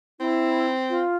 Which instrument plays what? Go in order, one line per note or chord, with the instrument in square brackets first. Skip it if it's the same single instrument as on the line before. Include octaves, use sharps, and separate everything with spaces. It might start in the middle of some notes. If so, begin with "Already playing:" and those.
[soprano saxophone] C4 [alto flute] E4
[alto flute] F4